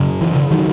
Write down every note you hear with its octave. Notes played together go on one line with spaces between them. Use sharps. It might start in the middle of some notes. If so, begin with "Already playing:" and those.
Already playing: F#2 C#3
E3
C#3
D#3 F#3